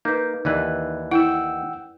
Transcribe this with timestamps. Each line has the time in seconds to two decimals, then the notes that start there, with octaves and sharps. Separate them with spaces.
0.05 A#3 D#4 B4 G6
0.45 D#2 E3 B4 D5
1.11 E4 F#5 G5 E6